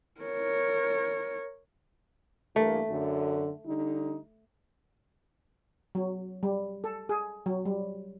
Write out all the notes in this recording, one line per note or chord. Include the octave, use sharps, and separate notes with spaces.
A#4 C#5
G2 E3 A3 A#3
F#2 D3
D3 G3 D#4
F#3
G3
A4
G#4
F#3
G3